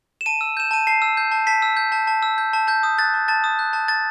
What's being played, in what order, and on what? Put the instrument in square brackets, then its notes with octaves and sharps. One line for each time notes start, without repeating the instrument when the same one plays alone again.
[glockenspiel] E7
A5 D#7
E6
G6 E7
A5 D#7
A5 C7
E6
G6
A5
A5 B6
E6
G6
A5
A5
E6
G6
A5
A5 G6
D#6
F#6 A6
A5
A5 A6
D#6
F#6
A5
A5 A6